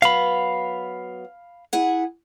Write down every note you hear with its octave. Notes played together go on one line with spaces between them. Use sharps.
F#3 B3 F5 B5
E4 G#4 F#5